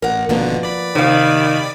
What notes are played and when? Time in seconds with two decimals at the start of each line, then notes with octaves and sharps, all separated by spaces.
0.02 A1 A#4 F#5
0.29 G#1 B2 D3 F3 A#3 B3
0.63 D5 B5
0.95 C3 D#3 F5